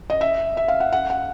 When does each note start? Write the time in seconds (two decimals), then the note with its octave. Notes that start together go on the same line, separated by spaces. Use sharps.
0.10 D#5
0.21 E5
0.57 E5
0.68 F5
0.80 F#5
0.93 F#5
1.10 F#5